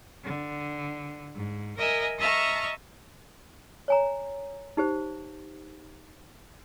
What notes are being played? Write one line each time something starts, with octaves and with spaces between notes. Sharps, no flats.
D3
G#2
A#4 D#5 E5 G#5 A#6
D#5 E5 A5 A#5 C#6 F6
C#5 G#5 A#5
D#4 G4 C5